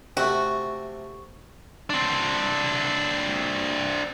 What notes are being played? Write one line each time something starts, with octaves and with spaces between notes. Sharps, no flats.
C3 A3 F#4
C4 D4